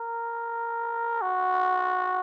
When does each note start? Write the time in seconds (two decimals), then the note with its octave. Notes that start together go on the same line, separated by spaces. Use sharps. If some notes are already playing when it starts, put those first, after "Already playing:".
Already playing: A#4
1.22 F#4